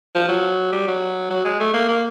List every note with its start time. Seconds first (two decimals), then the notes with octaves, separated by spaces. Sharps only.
0.15 F3
0.29 F#3
0.72 G3
0.88 F#3
1.30 F#3
1.45 G#3
1.60 A3
1.74 A#3
1.89 A#3